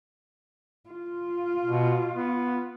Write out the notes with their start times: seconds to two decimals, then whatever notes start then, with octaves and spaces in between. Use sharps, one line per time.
0.90 F4
1.64 B2
2.14 B3